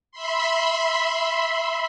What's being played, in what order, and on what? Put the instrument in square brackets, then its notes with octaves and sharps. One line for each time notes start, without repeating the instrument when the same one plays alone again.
[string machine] E5 B5 C6